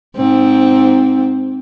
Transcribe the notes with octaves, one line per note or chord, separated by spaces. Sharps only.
G#2 C4